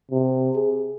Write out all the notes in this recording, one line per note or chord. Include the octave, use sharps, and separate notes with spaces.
C3
G#4